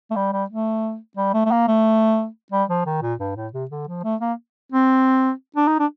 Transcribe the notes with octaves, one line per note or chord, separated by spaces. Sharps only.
A3
G3
G3
A3
G3
A3
A3
A#3
A3
G3
F3
D#3
A#2
G2
A2
C3
D3
F3
A3
A#3
C4
D4
D#4
D4